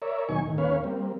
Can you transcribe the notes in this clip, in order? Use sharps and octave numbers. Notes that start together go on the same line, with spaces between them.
A#4 C#5 D5 E5
D#2 B2 F#3 D#4 G#5 C#6
A2 D#3
D#2 A#3 C#4 B4 C#5 F5
G3 A#3 C4